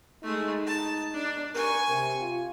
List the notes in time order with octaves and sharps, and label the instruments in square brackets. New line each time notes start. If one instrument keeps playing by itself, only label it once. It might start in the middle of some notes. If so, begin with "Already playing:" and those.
[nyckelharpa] G#3 A3 [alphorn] D#4
[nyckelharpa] A5
D4
[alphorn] A#4 [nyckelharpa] G#5 C#6
[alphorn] C3
F4